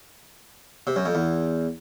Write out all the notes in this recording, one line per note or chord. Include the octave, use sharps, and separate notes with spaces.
C3
F#2
F2
E2